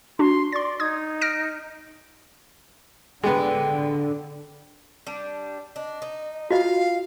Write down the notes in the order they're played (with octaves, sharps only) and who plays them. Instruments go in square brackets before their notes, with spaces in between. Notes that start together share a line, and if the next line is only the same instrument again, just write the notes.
[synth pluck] D4 F#4 [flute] C6
[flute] D5 [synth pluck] C6 A6
[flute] D#4 [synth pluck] D#6 G#6
[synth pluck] F6 A#6 D7
[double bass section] D3 [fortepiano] G#3 B3 [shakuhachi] G5
[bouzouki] G3 D4
[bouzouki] D4 [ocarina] D#5
[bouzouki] D#4
[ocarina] F4 [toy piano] F#4 D#5 [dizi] F5